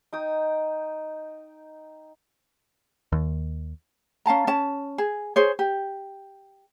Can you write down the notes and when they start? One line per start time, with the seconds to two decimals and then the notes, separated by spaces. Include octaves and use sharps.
0.13 D#4 G5 D#6
3.12 D#2
4.26 C#4 F5 A5 A#5
4.47 C#4 A5
4.98 G#4
5.36 G#4 C5 C#5
5.59 G4